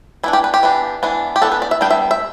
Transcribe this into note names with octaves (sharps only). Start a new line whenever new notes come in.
E3 B3 D4 E4
G4
B4
G4
E3 B3 D4
E3 B3 D4
G4
E3 B3 D4 A4
B4
D5
E5
G3 B3 D4 G5
E5
E5